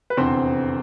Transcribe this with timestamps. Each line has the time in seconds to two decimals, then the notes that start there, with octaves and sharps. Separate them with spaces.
0.10 B4
0.17 F1 E2 D3 C4 C5